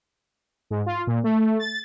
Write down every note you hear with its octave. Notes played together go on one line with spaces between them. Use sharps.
G#2
F4
A#2
A3
A6